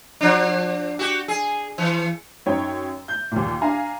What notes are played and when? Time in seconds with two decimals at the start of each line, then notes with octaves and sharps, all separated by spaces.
0.21 F3 D4
0.99 F#4 G4
1.28 G#4
1.78 E3
2.46 F#2 D#4 C#5 G5
3.08 G6
3.32 D#2 A#2
3.61 D4 F5 G#5 A#5